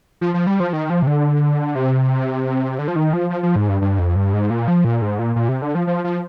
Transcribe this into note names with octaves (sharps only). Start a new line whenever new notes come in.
F3
F3
G3
F3
D#3
F3
C3
D3
C3
D3
F3
D#3
F3
F3
F3
G#2
G2
G2
F2
G2
G#2
A#2
F3
A#2
G#2
A#2
A#2
C3
D3
F3
F3
F3